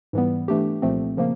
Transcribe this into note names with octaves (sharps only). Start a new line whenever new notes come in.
G#2 E3 G3 B3
E3 A3 D4 G4
C2 A#2 F3 A3 C4
C#3 F3 A#3